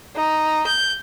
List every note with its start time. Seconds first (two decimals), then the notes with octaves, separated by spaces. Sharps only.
0.16 D#4
0.66 G6